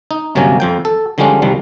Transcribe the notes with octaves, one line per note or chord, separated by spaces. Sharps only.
D#4
G1 C3 F#3 A#3 C#4 G#5
F2 F3 G5
A4
D3 F3 G3 G#3 C#4 D4
C2 D#3 F3 G3